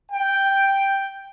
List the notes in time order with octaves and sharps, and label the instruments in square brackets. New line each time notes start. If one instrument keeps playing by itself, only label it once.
[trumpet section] G5